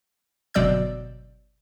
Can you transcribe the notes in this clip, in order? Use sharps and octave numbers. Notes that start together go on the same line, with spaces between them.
G1 B2 F#3 D5 E6 G6